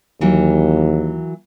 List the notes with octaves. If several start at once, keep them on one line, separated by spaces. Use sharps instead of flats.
D#2 E3 F#3 A#3